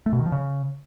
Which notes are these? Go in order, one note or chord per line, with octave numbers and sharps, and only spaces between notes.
A3
B2
D#3
F3
C#3